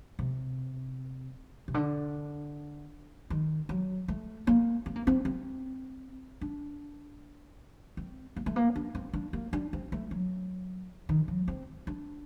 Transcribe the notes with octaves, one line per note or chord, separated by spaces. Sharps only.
C3
C3
D3
D#3
F#3
A3
A#3
C4
A#3
C4
C4
D4
C4
A#3
A3
A#3
D4
C4
D4
A#3
D4
C4
A3
F#3
D#3
F#3
C4
D4